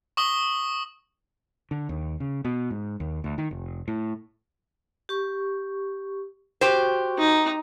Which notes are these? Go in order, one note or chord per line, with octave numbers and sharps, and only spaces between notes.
C#6 D#6 G7
D3
D#2
C#3
B2
G#2
D#2
D2
D#3
F1
A2
G4 C#6
F#4 G4 C5 C#6
D#4